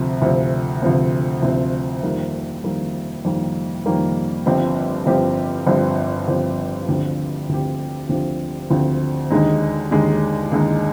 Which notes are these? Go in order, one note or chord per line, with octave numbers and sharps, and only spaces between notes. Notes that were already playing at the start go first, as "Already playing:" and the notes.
Already playing: D2 C3 F3 C4
D2 C3 F3 C4
D2 C3 F3 C4
D2 C3 F3 C4
F2 D#3 G3 A#3
F2 D#3 G3 A#3
F2 D#3 G3 A#3
F2 D#3 G3 A#3
G1 G2 F3 C4 G4
G1 G2 F3 C4 G4
G1 G2 F3 C4 G4
G1 G2 F3 C4 G4
D2 D3 F3 C4 G4
D2 D3 F3 C4 G4
D2 D3 F3 C4 G4
D2 D3 F3 C4 G4
D#2 D3 G#3 D#4
D#2 D3 G#3 D#4
D#2 D3 G#3 D#4